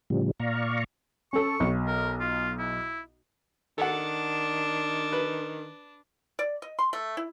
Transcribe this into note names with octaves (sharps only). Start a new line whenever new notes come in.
A2 C#3 F3 G3
A#2 D5 F5 A#5 C#6
C#4 A4 C#6
B1
A#4
F4
E4
D#3 D4 A4 F#5
B4
D5
D#5
C6
A3
E4